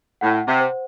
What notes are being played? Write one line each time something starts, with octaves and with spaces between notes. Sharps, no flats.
A2 F#5
C3
C5